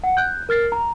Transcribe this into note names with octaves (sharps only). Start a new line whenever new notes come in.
F#5
F#6 G6
A#4 F6 A6 C7
A#5